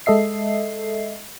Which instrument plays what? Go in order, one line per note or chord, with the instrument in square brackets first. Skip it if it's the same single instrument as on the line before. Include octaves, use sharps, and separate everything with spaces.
[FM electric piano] G#3 A4 D#5 E5 C7